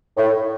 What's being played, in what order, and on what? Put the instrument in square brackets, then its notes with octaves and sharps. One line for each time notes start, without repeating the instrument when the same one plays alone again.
[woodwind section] A2